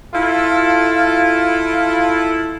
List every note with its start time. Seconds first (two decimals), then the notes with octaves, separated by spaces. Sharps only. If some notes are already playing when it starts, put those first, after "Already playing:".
0.14 E4 F4 A4